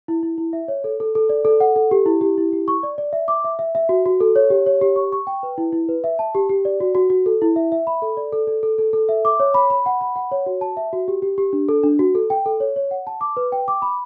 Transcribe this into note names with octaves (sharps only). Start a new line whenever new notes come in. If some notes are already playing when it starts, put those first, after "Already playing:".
E4
E4
E4
E5
C#5
A4
A4
A4
D5
A4
F#5
A4
G4
E4
G4
E4
G4
C#6
D5
D5
E5
D6
E5
E5
E5
F#4
F#4
A4
C#5
G4
C#5
G4
C#6
C#6
G5
B4
E4
E4
B4
E5
A5
G4
G4
D5
F#4
F#4
F#4
A4
E4
E5
E5
B5
A4
D5
A4
A4
A4
A4
A4
E5
D6
C#5
B5
B5
F#5
B5
F#5
C#5
F#4
A5
E5
F#4
G4
G4
G4
D4
A4
D4
F#4
A4
G5
A4
C#5
C#5
F#5
A5
D6
B4
G5
D6
B5